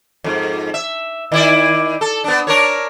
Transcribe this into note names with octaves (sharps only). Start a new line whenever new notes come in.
F2 G#2
E5
D#3 E4 D5
A4
B3 D4
D4 A#4 C#5